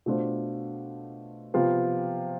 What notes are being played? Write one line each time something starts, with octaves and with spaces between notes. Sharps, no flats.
B2 A3 D4 F4 C5
C3 F3 B3 F4